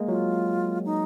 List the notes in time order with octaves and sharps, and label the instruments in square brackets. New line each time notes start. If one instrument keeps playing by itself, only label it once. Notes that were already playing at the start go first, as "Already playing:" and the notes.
Already playing: [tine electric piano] G#3 A#3
[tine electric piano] F#3 [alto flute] F4
[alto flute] D#4